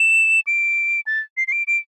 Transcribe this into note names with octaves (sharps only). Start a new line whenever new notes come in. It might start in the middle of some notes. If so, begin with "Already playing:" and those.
Already playing: E7
D7
A6
C7
C7
D7
D7